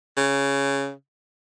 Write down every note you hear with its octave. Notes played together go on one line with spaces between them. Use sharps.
C#3